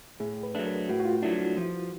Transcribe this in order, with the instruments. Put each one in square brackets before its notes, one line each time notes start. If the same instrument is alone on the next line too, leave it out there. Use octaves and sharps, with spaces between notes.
[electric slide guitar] A2 [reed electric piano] G#4
[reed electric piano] B4
[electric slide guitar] F#3 A3 D4
[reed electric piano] A#4
[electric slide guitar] A2 [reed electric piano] F#4
[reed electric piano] F#4
F4
[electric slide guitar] F#3 A3 D4 [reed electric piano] E4
[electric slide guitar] F3